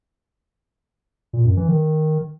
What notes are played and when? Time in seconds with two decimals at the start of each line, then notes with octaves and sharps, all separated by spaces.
1.33 A#2
1.45 F#2
1.57 E3
1.69 D#3